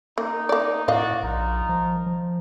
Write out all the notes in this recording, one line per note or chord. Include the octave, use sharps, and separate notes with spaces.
A#3 D#4
A#3 D5
A2 F#4 D5 D#5 F5
A#1 D#4 F4 A#4
F3
F3